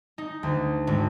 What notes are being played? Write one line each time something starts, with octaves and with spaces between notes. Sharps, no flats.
D#4
D2
G#1